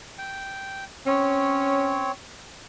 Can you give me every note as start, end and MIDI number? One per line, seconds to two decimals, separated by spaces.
0.18 0.84 79
1.07 2.12 60
1.07 2.11 61
1.07 2.12 73